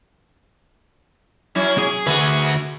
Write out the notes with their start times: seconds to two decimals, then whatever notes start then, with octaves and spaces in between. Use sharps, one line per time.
1.55 F#3 C#4 E4
1.78 G#4
2.07 D2 F#4 G#4 B4 E5